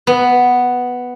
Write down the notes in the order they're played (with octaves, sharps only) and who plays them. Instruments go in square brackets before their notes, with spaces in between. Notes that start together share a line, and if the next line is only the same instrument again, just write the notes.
[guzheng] B3